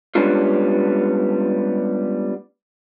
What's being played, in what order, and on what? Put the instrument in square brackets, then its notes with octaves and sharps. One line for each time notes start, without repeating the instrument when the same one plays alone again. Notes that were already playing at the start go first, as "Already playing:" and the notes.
[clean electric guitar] G3 G#3 B3 C#4 D4 F4